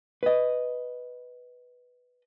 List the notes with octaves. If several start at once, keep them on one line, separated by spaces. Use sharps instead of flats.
B4 D#5